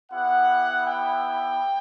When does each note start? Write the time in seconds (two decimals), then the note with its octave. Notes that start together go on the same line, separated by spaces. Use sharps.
0.11 B3 E4 G4 F#5
0.86 G5